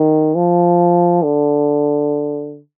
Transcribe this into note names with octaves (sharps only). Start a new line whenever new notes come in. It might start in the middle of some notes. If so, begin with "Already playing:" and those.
Already playing: D#3
F3
D3